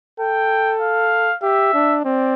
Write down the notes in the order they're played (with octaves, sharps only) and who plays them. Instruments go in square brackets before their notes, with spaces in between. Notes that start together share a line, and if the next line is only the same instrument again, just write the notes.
[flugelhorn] A4 [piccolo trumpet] G5
[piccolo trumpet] F5
[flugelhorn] G4 [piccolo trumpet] E5
[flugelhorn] D4
[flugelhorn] C4 [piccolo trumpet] D5